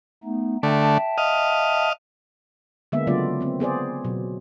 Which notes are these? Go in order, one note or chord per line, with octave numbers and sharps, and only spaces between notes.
A3 B3 D#4
D3 A3 E5 G5 A5
D#5 F5
D3 G#3 A#3 B3 E5
C#3 F#3 A3 B3 F4 D5
A#3 C4
B3 G#4 C5 D5
B2 F#3